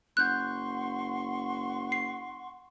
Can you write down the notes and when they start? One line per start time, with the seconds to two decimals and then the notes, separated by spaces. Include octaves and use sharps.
0.17 F#1 F#5 C6 C#6 F#6 G6
1.92 C7